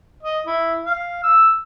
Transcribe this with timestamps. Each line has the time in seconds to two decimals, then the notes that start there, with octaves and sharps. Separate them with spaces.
0.23 D#5
0.46 E4
0.84 F5
1.23 E6